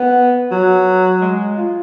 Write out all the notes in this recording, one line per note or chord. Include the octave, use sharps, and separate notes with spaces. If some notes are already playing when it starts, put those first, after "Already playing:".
Already playing: B3
F#3
G#3
F4